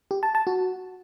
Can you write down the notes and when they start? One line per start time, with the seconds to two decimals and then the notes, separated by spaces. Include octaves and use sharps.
0.11 G4
0.23 A5
0.35 A5
0.47 F#4